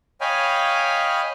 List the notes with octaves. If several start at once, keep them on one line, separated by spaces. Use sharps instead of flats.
C#5 D#5 F5 G5 G#5 B5